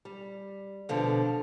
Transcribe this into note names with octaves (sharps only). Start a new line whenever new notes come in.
G3
B2 D3 F3